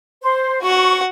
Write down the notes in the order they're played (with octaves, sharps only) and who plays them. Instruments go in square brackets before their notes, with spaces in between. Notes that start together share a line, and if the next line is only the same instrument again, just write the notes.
[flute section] C5
[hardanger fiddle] F#4 F#5 [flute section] C#6